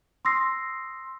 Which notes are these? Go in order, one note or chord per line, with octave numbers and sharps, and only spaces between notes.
C6 D#6 E6 A#6 C7